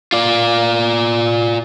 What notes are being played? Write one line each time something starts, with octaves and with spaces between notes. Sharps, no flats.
F4 D5